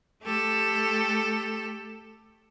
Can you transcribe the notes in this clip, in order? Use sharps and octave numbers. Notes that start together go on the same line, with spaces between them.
A3 G4 A4